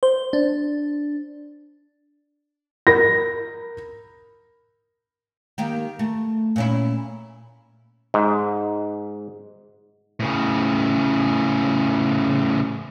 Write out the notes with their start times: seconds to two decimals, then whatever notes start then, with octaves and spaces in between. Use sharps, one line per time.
0.03 C5
0.33 D4
2.87 A#4 B5 A#6
5.58 D#3 A#3 G4
5.99 A3
6.56 A#2 C#4 E4
8.14 G#2
10.20 A2 C#3